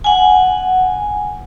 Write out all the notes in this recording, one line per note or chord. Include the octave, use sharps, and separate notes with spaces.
F#5 G#5